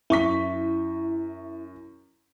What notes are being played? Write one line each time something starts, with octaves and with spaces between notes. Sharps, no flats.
F#2 E4 C#6 B6